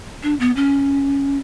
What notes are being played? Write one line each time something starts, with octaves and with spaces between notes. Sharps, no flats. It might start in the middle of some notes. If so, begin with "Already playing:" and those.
D4
B3
C#4